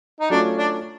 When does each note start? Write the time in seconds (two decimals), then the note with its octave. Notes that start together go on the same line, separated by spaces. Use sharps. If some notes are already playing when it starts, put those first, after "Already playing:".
0.20 D#4
0.30 F#3 A3 C#4 D4 F4
0.59 D4